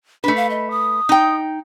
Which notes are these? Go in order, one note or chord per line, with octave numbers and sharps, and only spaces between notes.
A3 D4 B4
F5
D#5
D#6
D#4 G5